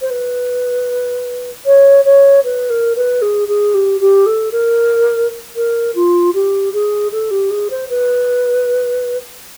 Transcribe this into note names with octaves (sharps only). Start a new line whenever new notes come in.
C5
B4
C#5
C#5
B4
A#4
B4
G#4
G#4
G4
G4
A4
A#4
A#4
F4
G4
G#4
A4
G4
G#4
C5
B4